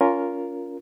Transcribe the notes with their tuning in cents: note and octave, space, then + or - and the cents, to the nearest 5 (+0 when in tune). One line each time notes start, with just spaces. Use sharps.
C#4 +25 F4 +0 A#4 +0